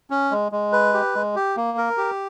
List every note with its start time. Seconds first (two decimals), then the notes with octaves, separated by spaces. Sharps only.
0.10 C#4
0.31 G#3
0.52 G#3
0.73 B4
0.94 G4
1.15 G#3
1.36 G4
1.56 A#3
1.78 A#4
1.97 G4